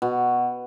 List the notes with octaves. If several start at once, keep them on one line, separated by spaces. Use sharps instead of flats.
B2 F#4